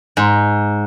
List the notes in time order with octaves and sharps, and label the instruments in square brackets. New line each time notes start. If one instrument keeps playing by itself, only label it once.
[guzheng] G#2